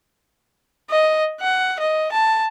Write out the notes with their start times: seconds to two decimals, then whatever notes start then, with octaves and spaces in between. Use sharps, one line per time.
0.90 D#5
1.40 F#5
1.79 D#5
2.12 A5